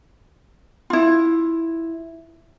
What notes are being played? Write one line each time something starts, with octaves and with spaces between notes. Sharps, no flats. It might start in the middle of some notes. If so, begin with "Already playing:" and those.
E4 F4